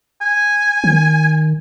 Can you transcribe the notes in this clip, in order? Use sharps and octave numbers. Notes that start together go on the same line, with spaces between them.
G#5
D#3